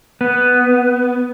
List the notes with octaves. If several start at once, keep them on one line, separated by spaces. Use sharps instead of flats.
B3